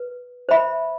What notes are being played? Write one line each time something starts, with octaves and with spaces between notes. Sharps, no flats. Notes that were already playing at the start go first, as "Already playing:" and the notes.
Already playing: B4
C5 E5 B5